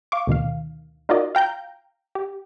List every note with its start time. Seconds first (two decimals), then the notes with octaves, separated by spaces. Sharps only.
0.12 F5 C#6 D6
0.27 D2 B2 D#3 F5
1.09 D#4 F4 F#4 A#4 D5 D#5
1.35 F5 G5 A#5 G6
2.15 G4